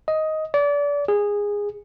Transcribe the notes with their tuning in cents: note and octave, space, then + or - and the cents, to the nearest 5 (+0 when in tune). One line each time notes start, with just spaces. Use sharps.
D#5 +10
D5 -30
G#4 -15